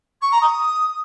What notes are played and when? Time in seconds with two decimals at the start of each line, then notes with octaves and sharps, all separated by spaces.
0.21 C#6
0.31 A#5
0.41 D#6